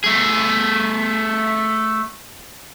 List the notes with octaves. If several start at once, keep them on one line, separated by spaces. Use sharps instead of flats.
A3 G#4